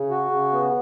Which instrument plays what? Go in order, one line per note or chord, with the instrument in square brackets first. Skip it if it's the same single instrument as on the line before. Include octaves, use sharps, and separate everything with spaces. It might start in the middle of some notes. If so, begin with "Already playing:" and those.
Already playing: [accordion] C#3
F#4
C#3
B3